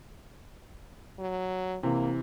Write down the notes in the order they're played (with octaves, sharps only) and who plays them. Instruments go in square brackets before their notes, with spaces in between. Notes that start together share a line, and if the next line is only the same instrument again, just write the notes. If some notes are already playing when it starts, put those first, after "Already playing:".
[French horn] F#3
[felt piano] C3 E3 [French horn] A#3